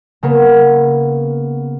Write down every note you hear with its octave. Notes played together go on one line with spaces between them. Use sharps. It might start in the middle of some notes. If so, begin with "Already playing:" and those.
C#3 A#3 B3